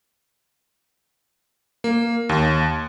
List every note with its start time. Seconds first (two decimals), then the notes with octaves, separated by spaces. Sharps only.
1.84 A#3
2.29 D#2